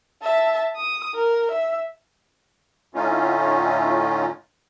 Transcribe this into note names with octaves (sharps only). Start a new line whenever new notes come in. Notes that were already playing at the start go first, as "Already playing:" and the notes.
E5 A5
D#6
A#4
E5
A2 D3 A3 C#4 D#4 F4